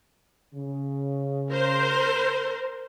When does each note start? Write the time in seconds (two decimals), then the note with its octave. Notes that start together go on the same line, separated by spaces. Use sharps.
0.54 C#3
1.51 A#4 C5